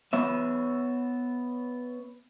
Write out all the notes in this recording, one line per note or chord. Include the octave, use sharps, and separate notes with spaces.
B3 C#5 E5